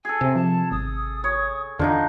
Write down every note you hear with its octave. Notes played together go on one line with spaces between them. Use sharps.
G#4 A4 G#5
C3
F3 A5
G#1 D#6
C#5
E2 D3 F3 D4 D#4 D#5